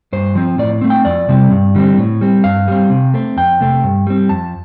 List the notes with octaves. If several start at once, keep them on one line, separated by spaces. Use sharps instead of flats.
G2 C5
F3 C4
A2 D5
A3 C4
G5
F2 D5
C3 G3 C4
G2
D3 G3 C4
A2
G3 C4
G2 F5
G3 C4
C3
A3 C4
F2 G5
C3 A3 C4
G2
G3 C4
F2 A5